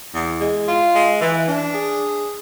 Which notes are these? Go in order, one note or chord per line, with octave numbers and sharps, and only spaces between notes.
E2
G#3
F4
G#3
E3
D4
G#4